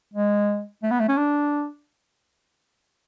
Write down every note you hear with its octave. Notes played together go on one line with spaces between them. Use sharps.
G#3
A3
B3
A3
C#4
D4